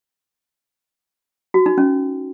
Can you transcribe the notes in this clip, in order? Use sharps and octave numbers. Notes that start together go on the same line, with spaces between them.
F#4
D#4
C#4